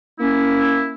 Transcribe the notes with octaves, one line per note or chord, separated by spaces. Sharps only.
A#3 C#4 E4